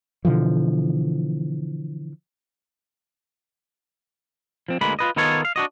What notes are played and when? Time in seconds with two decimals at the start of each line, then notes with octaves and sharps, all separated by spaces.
0.25 B2 D3 E3 F3
4.69 F3 C4
4.81 D2 G#3 A#3 B4 B5
4.99 F4 B4 D#5
5.16 D#3 B3 D#4 F4 A4 C#5
5.45 F5
5.56 D4 F#4 D#5